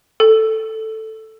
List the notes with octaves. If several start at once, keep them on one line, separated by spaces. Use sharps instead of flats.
A4